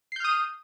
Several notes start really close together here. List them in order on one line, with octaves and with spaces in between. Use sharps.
C7 G6 F6 D#6